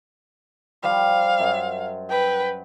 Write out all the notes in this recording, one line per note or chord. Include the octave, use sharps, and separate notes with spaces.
F3 G3 F5
F#2
B4 G5